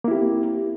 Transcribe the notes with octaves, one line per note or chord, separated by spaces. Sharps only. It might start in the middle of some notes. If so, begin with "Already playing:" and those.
A#3 C4 E4 G4